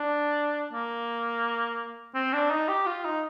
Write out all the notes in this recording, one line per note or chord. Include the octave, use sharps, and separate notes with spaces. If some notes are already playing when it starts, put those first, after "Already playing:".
Already playing: D4
A#3
C4
D4
D#4
G4
F4
D#4